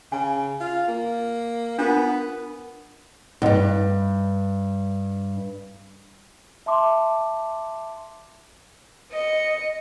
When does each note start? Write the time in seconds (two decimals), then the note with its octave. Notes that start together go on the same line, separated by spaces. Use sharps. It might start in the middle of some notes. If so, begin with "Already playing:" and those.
0.12 C#3 G#5
0.61 F4
0.88 A#3
1.79 B3 D4 F4 A#4
3.42 D2 G2
6.66 E5 A5 C6 D6
9.12 D#5 C#7